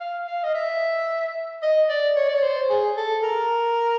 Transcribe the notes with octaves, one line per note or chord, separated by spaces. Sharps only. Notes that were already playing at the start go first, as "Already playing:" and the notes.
F5
F5
D#5
E5
D#5
D5
C#5
D5
C#5
C5
G#4
A4
A#4